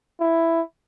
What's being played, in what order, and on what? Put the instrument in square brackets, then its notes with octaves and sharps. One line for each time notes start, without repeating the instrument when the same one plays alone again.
[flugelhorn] E4